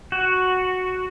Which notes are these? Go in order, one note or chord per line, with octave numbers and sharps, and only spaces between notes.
F#4